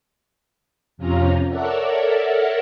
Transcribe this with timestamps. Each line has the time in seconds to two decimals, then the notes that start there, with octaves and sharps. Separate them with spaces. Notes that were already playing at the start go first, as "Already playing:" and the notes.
0.97 F2 C3 C#4 F4 A#5
1.48 A4 A#4 C#5 D5 E5 F#5